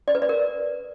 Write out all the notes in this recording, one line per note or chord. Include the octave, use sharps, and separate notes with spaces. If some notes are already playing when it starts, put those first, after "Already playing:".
D5
B4
D5
A#4